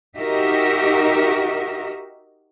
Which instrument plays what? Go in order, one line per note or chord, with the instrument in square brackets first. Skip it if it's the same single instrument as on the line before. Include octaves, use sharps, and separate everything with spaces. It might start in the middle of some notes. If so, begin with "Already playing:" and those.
[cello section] D#4 F#4 G4 A#4 D#5 E5